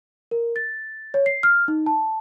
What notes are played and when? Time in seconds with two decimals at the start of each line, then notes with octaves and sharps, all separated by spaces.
0.31 A#4
0.56 A6
1.14 C#5
1.26 C7
1.43 F6
1.68 D#4
1.86 A5